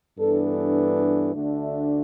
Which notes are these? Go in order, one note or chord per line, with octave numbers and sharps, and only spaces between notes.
G2 E3 B3 D4 A4
A4
A4
D2 D3 A3 D4
E5